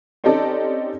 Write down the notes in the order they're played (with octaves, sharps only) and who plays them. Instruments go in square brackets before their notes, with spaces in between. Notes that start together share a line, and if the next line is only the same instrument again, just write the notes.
[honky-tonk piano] C4 C#4 D#4 G4 A4 D5